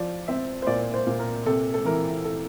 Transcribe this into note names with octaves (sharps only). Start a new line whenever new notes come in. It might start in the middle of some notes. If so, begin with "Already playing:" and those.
Already playing: F3 D5
C4 E5
C5
A#2 D5
C5
A#2
A#4
C3 A4
A4
E3 A#4
A4